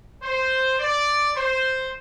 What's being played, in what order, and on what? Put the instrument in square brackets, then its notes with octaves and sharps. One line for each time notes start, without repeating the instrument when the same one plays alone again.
[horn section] C5
D5
C5